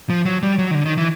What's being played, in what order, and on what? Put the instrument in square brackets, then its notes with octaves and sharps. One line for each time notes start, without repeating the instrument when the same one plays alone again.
[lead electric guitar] F3
F#3
G3
F#3
D#3
D3
D#3
E3